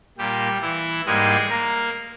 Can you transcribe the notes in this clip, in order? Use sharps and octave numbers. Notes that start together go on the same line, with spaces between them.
A#2 G3 A#3 G4
E3 E4
G#2 G3 G#3 A#3 G#4
A#3 A#4